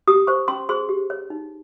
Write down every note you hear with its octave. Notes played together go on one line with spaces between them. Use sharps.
G4 D#6
C5 C#6
C#4 C6
G#4 C5 C6
G4
C#5
D#4